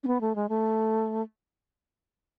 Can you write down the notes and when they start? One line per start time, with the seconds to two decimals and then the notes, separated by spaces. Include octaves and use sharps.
0.04 C#4
0.07 B3
0.21 A3
0.35 G#3
0.49 A3